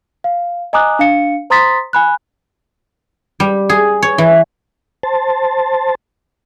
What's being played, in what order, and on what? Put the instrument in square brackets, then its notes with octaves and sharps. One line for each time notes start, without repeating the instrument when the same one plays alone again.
[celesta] F5
D#5 G#5 A#5 D6 D#6 F#6
D4 F5 C#7
C5 A#5 C6 D#6 A6 B6
G#5 B5 F#6
[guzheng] G3
G#4
C#5
E3
[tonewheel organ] C5 A5